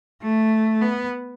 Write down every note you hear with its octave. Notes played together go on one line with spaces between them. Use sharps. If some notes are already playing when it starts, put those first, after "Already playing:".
A3
B3